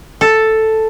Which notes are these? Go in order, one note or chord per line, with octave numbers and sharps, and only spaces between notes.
A4